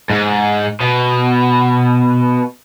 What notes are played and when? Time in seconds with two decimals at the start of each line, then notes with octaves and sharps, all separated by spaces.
0.10 G#2
0.80 B2